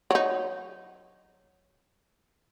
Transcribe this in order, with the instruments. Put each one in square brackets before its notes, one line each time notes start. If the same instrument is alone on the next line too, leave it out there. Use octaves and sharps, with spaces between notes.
[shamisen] F#3 D#4